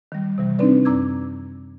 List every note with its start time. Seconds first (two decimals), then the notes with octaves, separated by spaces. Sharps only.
0.12 D#3 G3
0.38 C3 E3 G3
0.59 C4 D4 D#4 B4 D5
0.85 F#2 A#5 D6 E6 G#6